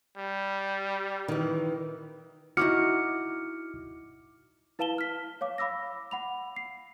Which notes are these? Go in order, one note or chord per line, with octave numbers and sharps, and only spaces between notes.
G3
D#3 E3
D#4 E4 F#4 D6 F6 C#7
E4 B4 F5 A5 E7 G7
F6 B6
C#5 F5 D6
F5 B5 D6 E6 A#6
F#5 B5 F7
C7